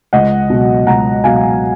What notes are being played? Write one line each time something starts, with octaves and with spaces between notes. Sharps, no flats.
C#2 D#5 F#5
B2 F#3
C#2 F#5 A#5
B2 F#3 F5 G#5